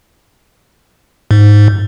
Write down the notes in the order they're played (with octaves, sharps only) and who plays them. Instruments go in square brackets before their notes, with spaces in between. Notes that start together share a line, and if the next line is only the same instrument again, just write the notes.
[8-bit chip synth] G#2